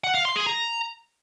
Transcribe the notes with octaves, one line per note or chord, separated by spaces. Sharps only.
F#5
F5
C6
G#4
A#5